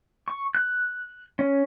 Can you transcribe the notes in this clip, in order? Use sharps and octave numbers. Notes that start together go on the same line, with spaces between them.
C#6
F#6
C#4